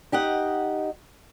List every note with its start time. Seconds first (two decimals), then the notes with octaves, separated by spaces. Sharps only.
0.12 D#4 G4 D#5 F#5